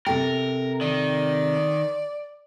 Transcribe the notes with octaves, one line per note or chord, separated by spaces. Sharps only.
C3 A4 A#4 G5
D#3 D5